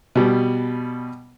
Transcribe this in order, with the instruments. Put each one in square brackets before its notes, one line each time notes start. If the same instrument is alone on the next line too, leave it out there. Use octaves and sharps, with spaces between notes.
[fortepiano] B2 G3